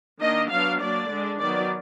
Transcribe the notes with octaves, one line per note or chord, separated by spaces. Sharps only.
D#3 A#3 D4 D#5
F#3 B3 D4 F5
F#3 A#3 D4 D5
D3 G#3 D4
D#3 F#3 B3 D5